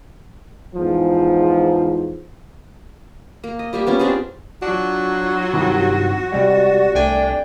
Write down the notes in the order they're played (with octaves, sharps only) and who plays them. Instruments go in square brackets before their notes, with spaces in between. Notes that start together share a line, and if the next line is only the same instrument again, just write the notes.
[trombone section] E2 G#2 F3
[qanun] A#3
D#5
G3 A#3 G4 E5
B3 C#4 F4
C4 D4 G4 G#4
[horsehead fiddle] F#3 F4 [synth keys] D4 [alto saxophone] F#4
[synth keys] G2 C3 D#3
[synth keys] C3 G3 G#3 [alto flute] D5
[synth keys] C2 A3 G#5 [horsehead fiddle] D4 [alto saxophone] G5